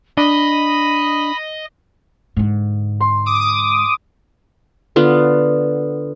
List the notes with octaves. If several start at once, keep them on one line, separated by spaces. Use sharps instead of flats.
D4 D#5 B5
G#2 D3
C6
D6 D#6
D3 B3 F4